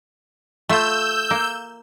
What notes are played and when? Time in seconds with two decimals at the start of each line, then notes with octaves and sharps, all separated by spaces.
0.69 A3 F4 E6 G6
1.31 A#3